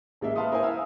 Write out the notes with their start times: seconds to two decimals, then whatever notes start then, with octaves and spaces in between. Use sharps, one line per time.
0.21 A1 G#3 A#3 E5
0.36 B4 E5 F5 A5 C6 D#6
0.52 E4 A#4 C5 E5 G#5
0.63 F5 D#6 E6